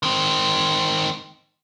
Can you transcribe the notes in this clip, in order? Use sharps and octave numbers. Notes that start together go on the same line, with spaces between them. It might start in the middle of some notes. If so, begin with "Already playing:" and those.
D#3 C4